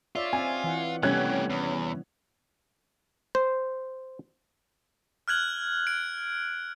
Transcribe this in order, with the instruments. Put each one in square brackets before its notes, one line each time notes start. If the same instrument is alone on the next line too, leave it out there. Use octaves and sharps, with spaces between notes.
[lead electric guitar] F4 [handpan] C#5 D5 E5
[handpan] C4 [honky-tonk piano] G#5
[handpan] E3 F#5
[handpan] C3 G3 B3 [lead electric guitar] A3 G4 [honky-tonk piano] C#4 F#6 G#6
[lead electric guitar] E2
[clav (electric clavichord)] C5
[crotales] F6 F#6 G#6 F#7
D7